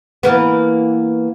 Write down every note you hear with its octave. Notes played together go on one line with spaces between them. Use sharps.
E3 A#3 B3